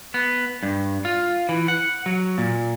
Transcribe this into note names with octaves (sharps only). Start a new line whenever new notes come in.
B3
G2
F4
E3
F#5
F#3
A#2